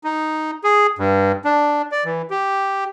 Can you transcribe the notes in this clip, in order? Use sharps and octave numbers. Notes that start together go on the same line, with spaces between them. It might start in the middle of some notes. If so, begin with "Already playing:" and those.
D#4
G#4
G2
D4
D5
E3
G4